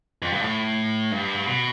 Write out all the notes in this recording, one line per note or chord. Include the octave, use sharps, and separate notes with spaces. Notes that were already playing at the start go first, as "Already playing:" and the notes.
F2
G2
A2
G2
B2